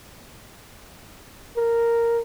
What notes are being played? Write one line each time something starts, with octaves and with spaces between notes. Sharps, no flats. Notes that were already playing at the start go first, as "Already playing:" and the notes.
A#4